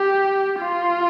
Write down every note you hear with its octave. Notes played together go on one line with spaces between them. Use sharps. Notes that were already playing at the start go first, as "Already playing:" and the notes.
Already playing: G4
F4